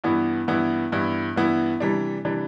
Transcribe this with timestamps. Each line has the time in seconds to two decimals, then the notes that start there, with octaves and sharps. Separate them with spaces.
0.04 G2 E3 B3 E4
0.48 G2 E3 B3 E4
0.92 G2 E3 B3 E4
1.36 G2 E3 B3 E4
1.80 C3 E3 G3 D4
2.25 C3 E3 G3 D4